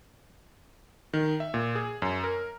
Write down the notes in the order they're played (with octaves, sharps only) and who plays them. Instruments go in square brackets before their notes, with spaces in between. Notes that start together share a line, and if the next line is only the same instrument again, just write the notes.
[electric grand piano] D#3
E5
A#2
G#4
F#2
A#4